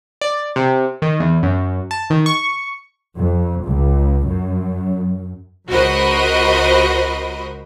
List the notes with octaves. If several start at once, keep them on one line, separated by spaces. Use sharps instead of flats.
D5
C3
D#3
E2
F#2
A5
D#3
C#6
F2
C#2
F#2
C#2 F#4 A#4 C5 D#5 B5